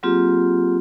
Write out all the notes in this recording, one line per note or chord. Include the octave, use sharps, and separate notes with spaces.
F#3 A#3 C4 F4 G4 G#4